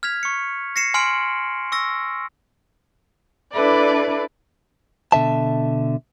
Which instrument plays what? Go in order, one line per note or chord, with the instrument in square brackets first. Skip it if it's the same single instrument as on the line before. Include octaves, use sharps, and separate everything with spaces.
[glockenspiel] F6 G#6 B6 F7
C#6 C#7
A#6 C7 C#7 E7
G#5 C6 F6 C7 D7 F#7
C#6 E6 A#6
[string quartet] D4 E4 A4 B4 D5
[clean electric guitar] B2 D3 E5 A5